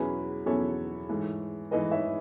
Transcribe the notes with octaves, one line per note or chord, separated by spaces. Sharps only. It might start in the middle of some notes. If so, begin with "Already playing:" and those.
Already playing: E2 B2 F#3 C#4 E4 G#4 B4
E2 B2 F#3 C#4 E4 A4 C#5
G#2 E3 A3
G#2 E3 A3 B4 D#5
C#5 E5